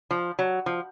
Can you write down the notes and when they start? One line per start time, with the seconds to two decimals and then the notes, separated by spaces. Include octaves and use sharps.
0.11 F3
0.39 F#3
0.66 F3